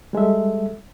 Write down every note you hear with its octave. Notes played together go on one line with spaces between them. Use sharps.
G3 G#3 A4 E5